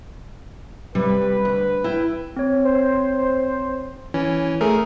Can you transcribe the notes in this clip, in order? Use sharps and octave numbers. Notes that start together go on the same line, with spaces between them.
C3 G3 B4
D2
E4 G5
C4 C#5
C5
E3 C#4
A3 G#4 A#4